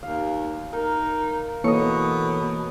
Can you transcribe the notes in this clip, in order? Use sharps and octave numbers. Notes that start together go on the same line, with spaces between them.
D#2 F5
D#4 A#4
B2 E3 A#3 A4 C#5 D#5 C#7